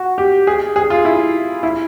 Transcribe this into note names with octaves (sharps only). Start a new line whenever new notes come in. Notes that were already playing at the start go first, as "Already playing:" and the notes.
Already playing: F#4
G4
G#4
G#4
F4
E4
E4